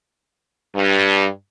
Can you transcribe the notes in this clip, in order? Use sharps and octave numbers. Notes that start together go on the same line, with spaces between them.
G2